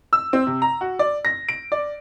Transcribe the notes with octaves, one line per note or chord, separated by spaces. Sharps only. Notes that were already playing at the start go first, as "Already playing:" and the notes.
E6
C4
C3
A#5
F#4
D5
A#6
D7
D5